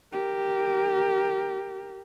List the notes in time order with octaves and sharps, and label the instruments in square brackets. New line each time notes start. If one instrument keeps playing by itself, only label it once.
[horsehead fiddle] G4 A#4